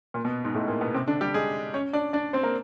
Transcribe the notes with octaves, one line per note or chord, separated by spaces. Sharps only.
A#2 A#3
B2 B3
G#2 G#3
A2 A3
A#2 A#3
B2 B3
C3 C4
D3 D4
G3 G4
G#3 G#4
C#4 C#5
D4 D5
D4 D5
C4 C5
A#3 A#4